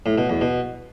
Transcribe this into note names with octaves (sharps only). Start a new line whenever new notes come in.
A2
B2
E2
B2